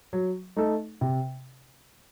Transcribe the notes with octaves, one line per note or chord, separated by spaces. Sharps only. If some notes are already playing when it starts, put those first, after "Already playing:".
F#3
A3 D#4 A4
C3